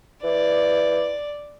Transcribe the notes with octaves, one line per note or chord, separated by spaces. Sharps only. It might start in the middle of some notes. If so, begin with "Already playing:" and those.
E3 D5